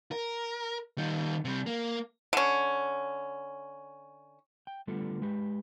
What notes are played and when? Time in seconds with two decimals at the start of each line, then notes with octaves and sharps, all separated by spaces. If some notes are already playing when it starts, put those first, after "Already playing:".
0.12 A#4
0.98 D#3 G3
1.45 C3 G3
1.66 A#3
2.33 D3 C#4
4.67 G5
4.87 D3 G3 A3 B3 F4 A4
5.22 G#3 G4 B4